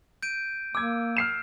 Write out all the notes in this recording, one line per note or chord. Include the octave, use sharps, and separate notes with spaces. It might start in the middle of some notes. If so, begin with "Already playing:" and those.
G6 D7 D#7
A#3 D6 E6 G#6
F6 C7 E7